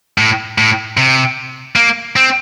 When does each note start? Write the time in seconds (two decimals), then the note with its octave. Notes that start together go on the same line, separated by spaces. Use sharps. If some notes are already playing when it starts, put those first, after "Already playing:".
0.18 A2
0.58 A2
0.97 C3
1.76 A#3
2.16 C4